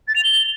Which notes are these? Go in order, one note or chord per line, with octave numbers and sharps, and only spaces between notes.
A6
F7
G7